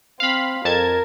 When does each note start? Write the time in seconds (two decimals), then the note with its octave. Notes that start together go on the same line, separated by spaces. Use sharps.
0.20 C4 F5 B5
0.65 F2 A#4 A5 G#6